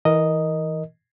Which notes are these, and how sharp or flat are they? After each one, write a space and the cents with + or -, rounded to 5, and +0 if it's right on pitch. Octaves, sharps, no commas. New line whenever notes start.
E3 -25 A#4 +0 D#5 +0